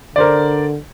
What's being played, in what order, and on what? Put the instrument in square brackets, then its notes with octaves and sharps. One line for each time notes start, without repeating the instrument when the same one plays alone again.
[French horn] D3 [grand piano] A#4 C5 D5